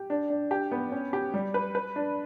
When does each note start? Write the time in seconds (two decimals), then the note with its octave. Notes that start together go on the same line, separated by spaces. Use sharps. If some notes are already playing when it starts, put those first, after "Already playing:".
Already playing: G4
0.10 D4
0.30 D4
0.51 G4
0.71 B3
0.92 C#4
1.13 G4
1.34 G3
1.54 B4
1.75 B4
1.96 D4